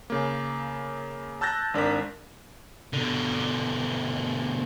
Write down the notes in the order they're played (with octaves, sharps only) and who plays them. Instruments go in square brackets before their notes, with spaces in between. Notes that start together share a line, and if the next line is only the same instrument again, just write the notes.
[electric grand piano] C#3 A#3
A5 E6 F#6 G6 A6 A#6
G#1 D4 A#4 B6
[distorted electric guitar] B2 D3